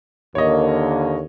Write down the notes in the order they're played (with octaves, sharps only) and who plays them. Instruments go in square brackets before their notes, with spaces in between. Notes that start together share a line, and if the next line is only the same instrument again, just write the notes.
[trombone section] D#2 D3 A#3 [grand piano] C#5 D#5